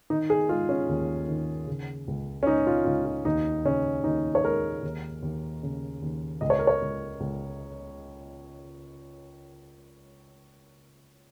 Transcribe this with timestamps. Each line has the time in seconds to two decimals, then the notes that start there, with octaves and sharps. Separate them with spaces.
0.10 D#3 D#4
0.30 G#4
0.49 G#3 F4
0.69 C#4
0.89 D#2
1.29 D#3
1.67 C#3
2.08 C#2
2.43 C#4
2.47 C#2 D#4
2.67 F4
2.85 C#2 F4
3.06 F4
3.25 D#2 D#4
3.64 C#3 C#4
4.04 D#2 D#4
4.35 C#5
4.43 G#3 A#4
4.83 D#2
5.22 D#2
5.63 C#3
6.02 D#2
6.41 C#2 D#5
6.50 C#5
6.59 A#4
6.67 C#5
6.81 C#2
7.20 C#2